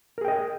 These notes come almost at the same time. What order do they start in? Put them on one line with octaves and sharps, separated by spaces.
A#4 G#4 G5 D#5